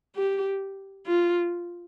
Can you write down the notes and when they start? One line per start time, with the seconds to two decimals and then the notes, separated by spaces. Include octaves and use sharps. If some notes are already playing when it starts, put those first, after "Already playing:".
0.16 G4
1.06 F4